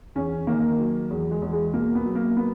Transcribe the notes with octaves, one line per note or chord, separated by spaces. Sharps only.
E2 C#4
D#3 A#3
F#3
E2
G#3
E2
G#3
B2 A#3
B3
F#3
A#3
B3